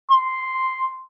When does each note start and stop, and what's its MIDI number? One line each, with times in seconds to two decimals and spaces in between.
0.11 1.00 84